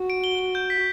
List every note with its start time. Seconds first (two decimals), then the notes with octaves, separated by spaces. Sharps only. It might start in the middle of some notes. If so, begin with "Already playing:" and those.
Already playing: F#4
0.10 D7
0.24 G7
0.39 G7
0.55 G6
0.70 B6